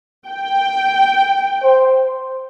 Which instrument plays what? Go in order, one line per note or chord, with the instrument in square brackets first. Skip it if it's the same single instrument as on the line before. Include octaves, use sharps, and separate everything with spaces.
[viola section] G5
[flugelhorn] C5